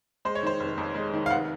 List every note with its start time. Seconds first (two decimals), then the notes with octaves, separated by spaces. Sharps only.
0.25 G#3 C5
0.35 C#5
0.43 D#3 C5
0.60 F1
0.78 F2
0.95 G#3
1.14 D#3
1.26 F5
1.30 F1 F#5